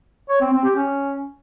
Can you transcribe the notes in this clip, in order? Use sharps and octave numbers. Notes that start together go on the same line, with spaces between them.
C#5
C4
C4
G4
C#4